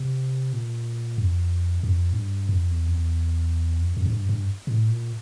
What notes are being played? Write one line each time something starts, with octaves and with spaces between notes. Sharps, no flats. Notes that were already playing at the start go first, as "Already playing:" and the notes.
Already playing: C3
A#2
F2
F2
A2
G2
F2
E2
F2
E2
F2
F2
A2
G2
G2
A2
A#2